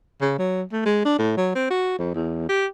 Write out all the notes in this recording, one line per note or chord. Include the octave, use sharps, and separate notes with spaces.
C#3
F#3
A3
G#3
D4
A2
F#3
C4
F#4
F2
E2
G4